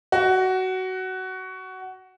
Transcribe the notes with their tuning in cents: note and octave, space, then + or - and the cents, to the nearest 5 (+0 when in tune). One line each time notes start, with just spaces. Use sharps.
F#4 +15